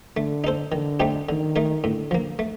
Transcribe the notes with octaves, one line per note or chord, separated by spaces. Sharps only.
D3 A3
D#4 A4 C5
D3 D#3
A3 C4 D#4 G4
D3 D#3
A3 D#4 A#4
A2 D3
F3 A#3
A3